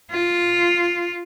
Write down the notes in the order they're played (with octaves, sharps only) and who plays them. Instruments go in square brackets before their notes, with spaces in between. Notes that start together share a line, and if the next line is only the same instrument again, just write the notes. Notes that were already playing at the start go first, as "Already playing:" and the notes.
[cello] F4